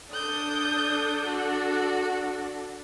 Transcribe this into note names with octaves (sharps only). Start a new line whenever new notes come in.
D4 A4 D#6 G6
F#4